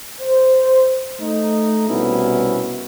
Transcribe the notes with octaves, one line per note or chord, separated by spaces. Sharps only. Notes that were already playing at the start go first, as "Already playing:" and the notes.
C5
A3 D#4
C2 B2 B3 C#4 E4